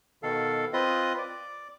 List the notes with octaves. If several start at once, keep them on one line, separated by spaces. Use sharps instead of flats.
B2 D#3 A4 F5
C4 F4 B4 D#5 D#6
D5